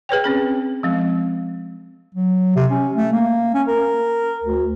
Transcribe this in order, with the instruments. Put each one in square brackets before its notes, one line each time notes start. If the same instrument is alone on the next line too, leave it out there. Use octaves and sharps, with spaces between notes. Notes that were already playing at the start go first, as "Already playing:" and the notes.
[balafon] G#4 B4 C#5 G5
C4 C#4 G#4
F3 G#3 C4
[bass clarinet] F#3
C3
C#4
A3
A#3
C#4
A#4
D2